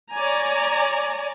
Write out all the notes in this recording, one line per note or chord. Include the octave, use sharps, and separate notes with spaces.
C#5 D5 G#5 A#5